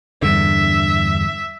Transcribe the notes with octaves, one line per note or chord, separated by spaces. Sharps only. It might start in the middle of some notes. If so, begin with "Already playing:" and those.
E2 G2 D3 E5